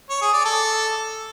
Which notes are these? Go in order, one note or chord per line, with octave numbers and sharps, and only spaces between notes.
C#5
G#4
D5
A4